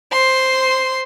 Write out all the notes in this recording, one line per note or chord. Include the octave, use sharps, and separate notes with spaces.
C5 C6